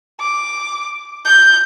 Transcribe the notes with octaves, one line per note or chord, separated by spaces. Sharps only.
D6
G6